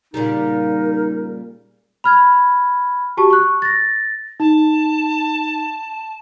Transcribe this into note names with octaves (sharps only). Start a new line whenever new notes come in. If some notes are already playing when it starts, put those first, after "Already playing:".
A#2 C#3 G3 D#4 A#4
B5 F6 G#6
F#4 G4 A5 C#6
C#6 F#6
A6 A#6
D#4 A5